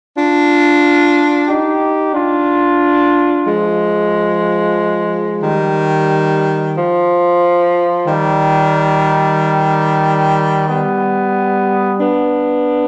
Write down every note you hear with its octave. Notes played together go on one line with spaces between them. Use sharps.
D4 F4
D#4 G4
D4 F4
F3 G#3
D#3 G3
F3
D#3 G3
G3 B3
B3 D4